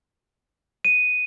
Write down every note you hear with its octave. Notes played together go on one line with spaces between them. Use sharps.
D#7